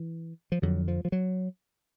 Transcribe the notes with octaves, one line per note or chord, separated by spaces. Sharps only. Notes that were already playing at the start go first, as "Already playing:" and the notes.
Already playing: E3
F3
F2 D3 F#3
F3
F3
F#3